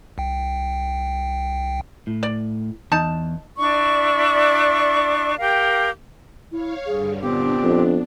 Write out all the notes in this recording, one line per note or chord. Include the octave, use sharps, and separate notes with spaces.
C2 G5
A2
D5
E2 D#4 A5
D4 E4 D5 C#6
G4 A#4 F5 G5
E4 C#5 F5
G2 D3 G#4
A#2 B3 C4 D4 G4
F2